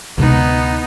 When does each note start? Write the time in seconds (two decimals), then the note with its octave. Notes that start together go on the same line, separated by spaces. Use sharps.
0.18 D2 C3 G#3 B3 D#4